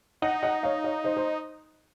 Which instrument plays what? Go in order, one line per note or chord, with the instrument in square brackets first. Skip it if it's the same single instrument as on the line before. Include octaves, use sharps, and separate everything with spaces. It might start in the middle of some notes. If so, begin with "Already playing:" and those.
[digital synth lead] D#4 [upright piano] D#5 F#5
[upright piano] D#5 F#5
C#5 F5
C#5 F5
C5 D#5
C5